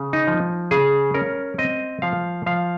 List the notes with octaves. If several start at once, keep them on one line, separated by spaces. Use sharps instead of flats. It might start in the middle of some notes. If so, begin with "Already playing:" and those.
Already playing: C#3
D#4
F3
C#3 G#4
C#4 A#4
C4 D#5
F3 F5
F3 F5